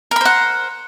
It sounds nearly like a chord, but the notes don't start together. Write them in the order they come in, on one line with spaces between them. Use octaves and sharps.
A#4 B5 C5 F#5